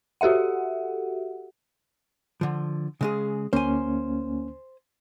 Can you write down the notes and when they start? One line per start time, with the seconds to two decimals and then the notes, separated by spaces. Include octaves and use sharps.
0.21 F#4 G4 A4 E5 F#5
2.41 D3 F3
3.01 C#3 G#3 G#4
3.53 D2 A#3 C#4 C5 G#5